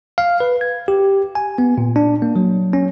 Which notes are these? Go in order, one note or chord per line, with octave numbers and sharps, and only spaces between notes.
F5
B4
G#6
G4
G#5
B3
A#2
D4
A#3
F#3
C#4